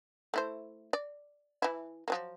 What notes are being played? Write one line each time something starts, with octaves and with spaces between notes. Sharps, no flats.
A3 E4 C5
D5
E3 E4
F3 F#3 A#3